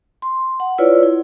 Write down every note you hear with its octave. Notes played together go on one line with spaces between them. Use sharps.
C6
F#5
E4 F4 B4 C#5 D5 E6
E4